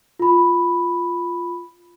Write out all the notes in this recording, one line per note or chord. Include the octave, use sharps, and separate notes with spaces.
F4 B5